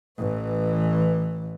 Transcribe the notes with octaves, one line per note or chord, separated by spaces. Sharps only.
A1 E3